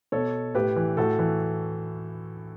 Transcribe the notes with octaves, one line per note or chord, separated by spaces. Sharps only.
B2 A4 C#5
A2 G4 B4
E3
A2 F#4 A4
E3